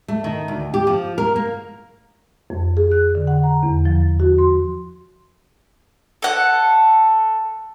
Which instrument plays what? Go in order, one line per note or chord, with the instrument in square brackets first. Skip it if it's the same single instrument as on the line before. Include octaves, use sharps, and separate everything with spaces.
[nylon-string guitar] A3
D#3
D2
G4
F3
A#4
A#3
[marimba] F2
G#4
F#6
D3
F#5
A#5
E2
F3
F#4
C6
[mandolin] A4 F#5